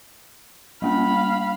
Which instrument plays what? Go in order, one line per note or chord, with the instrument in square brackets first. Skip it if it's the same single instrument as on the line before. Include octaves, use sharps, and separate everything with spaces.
[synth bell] G3 A#3 C#4 [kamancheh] F5 B5